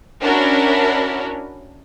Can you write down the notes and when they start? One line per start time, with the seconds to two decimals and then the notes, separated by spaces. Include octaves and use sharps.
0.21 C#4 D4 E4 F#4 A#4